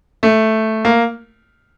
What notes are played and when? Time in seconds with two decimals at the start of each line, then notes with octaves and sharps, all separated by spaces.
0.23 A3
0.85 A#3